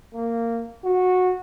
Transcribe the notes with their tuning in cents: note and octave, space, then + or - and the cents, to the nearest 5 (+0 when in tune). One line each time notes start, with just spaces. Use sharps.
A#3 -15
F#4 -15